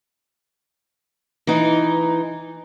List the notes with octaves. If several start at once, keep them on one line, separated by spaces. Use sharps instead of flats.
E3 D#4